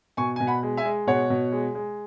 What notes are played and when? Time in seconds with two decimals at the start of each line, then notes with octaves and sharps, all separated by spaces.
0.17 B2 G#5 C#6
0.36 B2 G#5
0.47 F#5 B5
0.63 G#3
0.77 E5 G#5
0.85 G#3
1.07 B2 C#5 F#5
1.30 B2
1.52 G#3
1.75 G#3